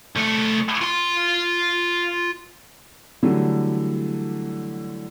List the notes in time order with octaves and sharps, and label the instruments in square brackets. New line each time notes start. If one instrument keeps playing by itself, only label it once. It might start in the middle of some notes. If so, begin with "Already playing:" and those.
[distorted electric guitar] C2 A3
F4 C6
[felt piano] D3 E3 F#3 G3 A3